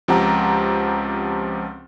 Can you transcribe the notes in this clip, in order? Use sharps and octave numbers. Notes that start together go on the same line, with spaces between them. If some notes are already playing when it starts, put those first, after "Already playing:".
C#2 F3 C4 G4 F#5 A#5